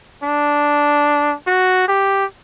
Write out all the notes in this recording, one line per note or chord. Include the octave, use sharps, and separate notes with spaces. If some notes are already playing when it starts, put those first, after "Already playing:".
D4
F#4
G4